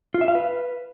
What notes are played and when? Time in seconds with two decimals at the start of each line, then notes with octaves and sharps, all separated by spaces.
0.14 F4
0.21 E5
0.28 F5
0.35 B4